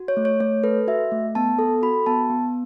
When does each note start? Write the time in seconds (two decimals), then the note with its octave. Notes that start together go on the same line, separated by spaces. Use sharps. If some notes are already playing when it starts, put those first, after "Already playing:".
Already playing: F#4
0.08 C#5
0.17 A3
0.25 C#5
0.40 A3 C#5
0.63 A4 B4
0.87 F#4 E5
1.12 A3
1.35 B3 A5
1.59 A4
1.82 F#4 B5
2.06 B3 A5
2.30 B3